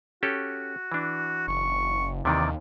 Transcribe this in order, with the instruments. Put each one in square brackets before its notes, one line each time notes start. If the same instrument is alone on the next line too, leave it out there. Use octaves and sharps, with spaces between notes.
[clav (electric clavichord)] C#4 G4 A4 [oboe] F#4
[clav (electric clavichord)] E3 D4
[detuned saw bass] F#1 [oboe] C#6
[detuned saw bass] D#2 [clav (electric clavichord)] C3 D#3 E3 [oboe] D5